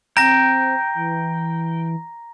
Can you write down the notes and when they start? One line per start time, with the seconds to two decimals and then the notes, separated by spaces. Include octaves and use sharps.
0.17 C4 G5 A#5 A#6
0.94 E3